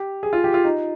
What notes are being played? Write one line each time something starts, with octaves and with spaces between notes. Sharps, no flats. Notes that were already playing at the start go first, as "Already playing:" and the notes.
Already playing: G4
G#4
F4
G4
F4
D#4